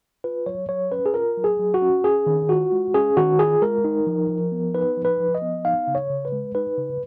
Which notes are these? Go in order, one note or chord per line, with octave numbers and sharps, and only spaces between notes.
F4 B4
F#3 C#5
F#3 C#5
C#4 B4
G#4
F4 A#4
F#3
G#4
F#3
F#4
C#4
C#4 G#4
D#3
F4 F#4
G#3
C#4 G#4
D#3 F#4
F4 G#4
G#3 A#4
D#4
F3
F3
B3
D#4 B4
F3
B4
F3
D#5
B3
D#4 F5
C#3
C#5
C#3
B4
G#3
D#4 B4
C#3